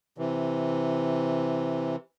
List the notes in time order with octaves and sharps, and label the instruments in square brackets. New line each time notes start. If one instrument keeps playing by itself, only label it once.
[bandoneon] C3 E3